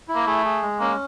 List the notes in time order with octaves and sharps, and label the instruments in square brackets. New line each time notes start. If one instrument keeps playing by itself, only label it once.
[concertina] E4
[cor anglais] A#3
[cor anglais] A3 [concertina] G#4
[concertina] G#4
G#3
[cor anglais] A#3 [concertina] C#4